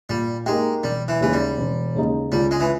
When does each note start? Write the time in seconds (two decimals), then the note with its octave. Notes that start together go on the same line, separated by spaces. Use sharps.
0.09 A#2 G3
0.46 G#3 A#3 D#4 G4
0.84 E1 G3
1.08 E3
1.21 D#2 C#3 E3 G#3 D#4
1.33 G3
1.58 E1
1.95 D#2 C#3 G#3 D#4
2.32 C#2 G3
2.51 G#3
2.60 E3